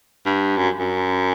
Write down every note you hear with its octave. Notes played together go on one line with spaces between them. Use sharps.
G2
F#2
F#2